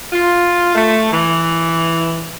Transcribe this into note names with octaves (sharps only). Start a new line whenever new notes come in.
F4
A3
E3